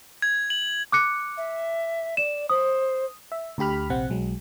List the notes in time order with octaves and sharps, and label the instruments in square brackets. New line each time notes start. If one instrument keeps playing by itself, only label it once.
[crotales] G#6
F#7
[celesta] D6 F#6 C#7
[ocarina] E5
[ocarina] D5 [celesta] E7
[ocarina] C5 [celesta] D#6
[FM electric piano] E5
D2 D3 G4 B5 F6
A#1 C3 C4 F#5
B1 F#3 G#3